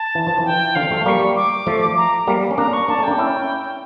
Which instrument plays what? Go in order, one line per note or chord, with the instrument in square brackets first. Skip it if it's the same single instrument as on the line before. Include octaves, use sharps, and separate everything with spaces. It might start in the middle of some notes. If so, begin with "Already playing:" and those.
Already playing: [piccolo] A5
[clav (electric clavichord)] E3
F3
E3
[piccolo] G5
[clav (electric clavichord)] D3 F3 [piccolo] F5
[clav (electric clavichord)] F3 A3
A3
[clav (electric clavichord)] G3 A#3 [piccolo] C#6
[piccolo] D6
[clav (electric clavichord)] F3 A3
[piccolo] A#5
[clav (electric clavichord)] G3 A#3
C#4
[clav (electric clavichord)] A#3 D4 [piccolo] A#5
[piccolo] C#6
[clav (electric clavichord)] A#3 D4 [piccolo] A5
[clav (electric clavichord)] A3 C#4
[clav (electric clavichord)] A#3 D4 [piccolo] G5
[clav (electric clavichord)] C#4 E4